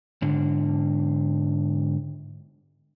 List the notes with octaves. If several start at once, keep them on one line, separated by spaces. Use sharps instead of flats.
G#2 D3